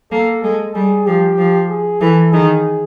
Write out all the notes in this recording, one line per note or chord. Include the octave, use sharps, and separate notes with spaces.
A#3 A4
G#3 A4
G3 G#4
F3 G4
F3
G#4
E3 A4
D#3 G#4